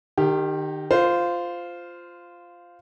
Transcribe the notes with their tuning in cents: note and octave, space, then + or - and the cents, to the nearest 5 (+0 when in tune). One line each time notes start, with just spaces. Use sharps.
D#3 -30 G4 +0
F4 +0 C5 -15